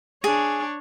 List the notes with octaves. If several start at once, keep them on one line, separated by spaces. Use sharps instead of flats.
D4 G#4 C#5